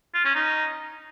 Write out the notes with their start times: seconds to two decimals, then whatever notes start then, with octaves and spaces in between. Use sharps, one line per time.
0.14 F4
0.24 C#4
0.35 D#4